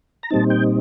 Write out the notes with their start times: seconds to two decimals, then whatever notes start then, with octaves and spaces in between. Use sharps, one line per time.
0.23 A#5
0.30 A#2 G3 C4 D#4 A5
0.50 G5